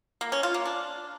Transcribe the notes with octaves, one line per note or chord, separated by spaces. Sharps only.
A#3
C#4
F4
A#3
D4